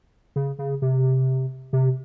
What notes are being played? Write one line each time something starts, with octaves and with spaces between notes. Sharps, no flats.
C#3
C#3
C3
C3